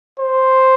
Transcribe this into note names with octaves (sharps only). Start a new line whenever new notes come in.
C5